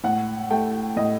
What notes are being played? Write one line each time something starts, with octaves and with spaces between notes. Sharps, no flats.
A2 F#5
A3 G5
A2 D#5